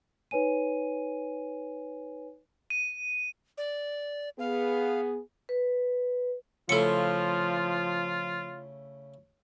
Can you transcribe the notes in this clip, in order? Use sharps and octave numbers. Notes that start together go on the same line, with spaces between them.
D#4 B4 C#5 G#5 D#7
D#7
D5
B3 G#4 F5
B4
C#3 F3 A3 E4 F4 A4 C#7